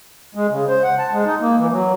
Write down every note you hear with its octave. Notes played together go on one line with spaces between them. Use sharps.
G#3
C#3
C5
F#5
A5
G#3
D#4
A#3
E3
F#3